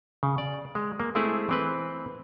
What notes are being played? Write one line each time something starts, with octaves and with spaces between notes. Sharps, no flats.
C#3
D5
G#3
A#3
G#3 A3 C4 E4 G#4
E3 C4 B4